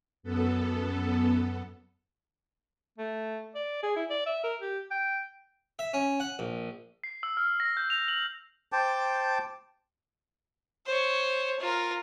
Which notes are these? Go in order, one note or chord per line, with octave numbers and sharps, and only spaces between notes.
F#2 B3 A4
A3
D5
G#4
E4
D5
E5
A#4
G4
G5
E5
C#4
F#5
A#1
C7
E6
F6
A#6
G6
F7
F#7
C5 G5 A5 D6
C5 C#5
F4 A#4